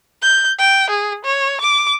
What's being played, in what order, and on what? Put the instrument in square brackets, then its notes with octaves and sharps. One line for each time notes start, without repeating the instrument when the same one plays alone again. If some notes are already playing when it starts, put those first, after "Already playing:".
[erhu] G6
G5
G#4
C#5
D6